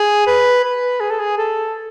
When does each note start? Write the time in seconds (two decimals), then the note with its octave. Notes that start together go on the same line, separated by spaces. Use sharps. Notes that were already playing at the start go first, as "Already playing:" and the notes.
Already playing: G#4
0.27 B4
0.64 B4
1.00 G#4
1.10 A4
1.19 G#4
1.38 A4